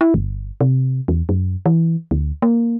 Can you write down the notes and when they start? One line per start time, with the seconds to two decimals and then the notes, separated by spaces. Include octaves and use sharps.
0.01 E4
0.14 G1
0.61 C3
1.08 E2
1.29 F#2
1.66 E3
2.11 D2
2.42 A#3